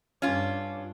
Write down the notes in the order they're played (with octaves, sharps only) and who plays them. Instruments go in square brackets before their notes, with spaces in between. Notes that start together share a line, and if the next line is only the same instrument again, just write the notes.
[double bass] G2 D4 [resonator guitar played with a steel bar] C#4 F4